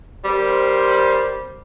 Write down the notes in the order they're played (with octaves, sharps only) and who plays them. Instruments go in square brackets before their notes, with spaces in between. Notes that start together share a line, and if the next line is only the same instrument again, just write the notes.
[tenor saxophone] G3 [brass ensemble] C4 A#4 C5